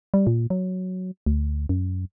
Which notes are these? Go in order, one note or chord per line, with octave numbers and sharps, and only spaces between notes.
G3
A#2
F#3
D2
F#2